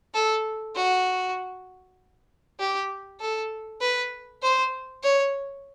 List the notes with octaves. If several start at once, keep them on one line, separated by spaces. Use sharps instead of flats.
A4
F#4
G4
A4
B4
C5
C#5